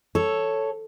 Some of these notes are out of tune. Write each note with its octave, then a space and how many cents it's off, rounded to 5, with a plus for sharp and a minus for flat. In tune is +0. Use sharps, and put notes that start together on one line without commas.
A4 +0 C#5 +0